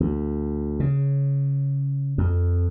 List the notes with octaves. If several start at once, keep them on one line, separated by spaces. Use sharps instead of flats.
D2
C#3
F2